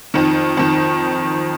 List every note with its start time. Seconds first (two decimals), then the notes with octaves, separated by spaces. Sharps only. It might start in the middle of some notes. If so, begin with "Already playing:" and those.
0.14 F2 D#3
0.57 F2 D#3